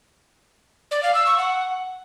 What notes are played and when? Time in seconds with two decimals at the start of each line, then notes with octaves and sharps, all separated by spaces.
0.91 D5
1.03 F5
1.14 E6
1.26 C#6
1.38 F#5